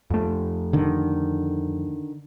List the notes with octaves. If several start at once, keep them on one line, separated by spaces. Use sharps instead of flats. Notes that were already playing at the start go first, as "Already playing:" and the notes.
F2 A3
D3 D#3